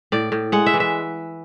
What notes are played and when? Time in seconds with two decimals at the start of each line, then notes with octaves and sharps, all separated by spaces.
0.12 A2 D5
0.32 A2
0.52 G#3 F#5
0.66 E5
0.74 E3
0.80 E5